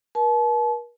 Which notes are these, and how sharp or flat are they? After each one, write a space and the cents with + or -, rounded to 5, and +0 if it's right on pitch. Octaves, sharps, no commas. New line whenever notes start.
A#4 +45 A5 -40